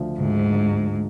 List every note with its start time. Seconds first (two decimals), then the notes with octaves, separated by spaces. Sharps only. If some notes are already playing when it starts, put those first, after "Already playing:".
Already playing: D2 D3 F3
0.20 D2 G#2
0.47 D2